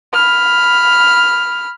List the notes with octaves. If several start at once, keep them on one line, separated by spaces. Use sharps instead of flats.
B5 F6